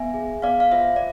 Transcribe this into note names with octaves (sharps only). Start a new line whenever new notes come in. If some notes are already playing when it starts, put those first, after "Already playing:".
Already playing: B3 E5 G#5
G#4
B3 D5 F5
F5
F4 C5 E5
D5